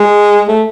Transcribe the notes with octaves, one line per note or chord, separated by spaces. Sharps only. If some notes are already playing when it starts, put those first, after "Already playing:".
Already playing: G#3
A3